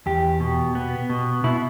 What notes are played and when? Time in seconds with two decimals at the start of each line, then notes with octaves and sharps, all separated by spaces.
0.06 E2 G4
0.40 B2
0.75 B3
1.09 B2
1.44 B2 E4